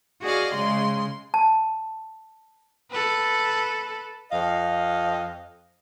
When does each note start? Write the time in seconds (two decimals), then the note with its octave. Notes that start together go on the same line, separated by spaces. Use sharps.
0.22 F#4 G#4 D5 D#5 F5
0.53 C#3 G#3 C6
1.34 A5
2.91 A4 B4
4.31 F2 D#5 F5